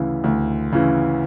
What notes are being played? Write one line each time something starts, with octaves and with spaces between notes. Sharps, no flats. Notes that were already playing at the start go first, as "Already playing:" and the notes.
Already playing: D2 C#3 E3
D2
C#3 E3